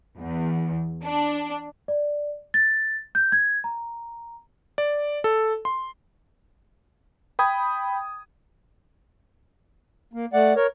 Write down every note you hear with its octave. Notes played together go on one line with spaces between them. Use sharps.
E2
D4
D5
A6
G6
G#6
A#5
D5
A4
C6
G5 B5 D#6 G#6
A#3
A3 D5 F#5
A#4 C#5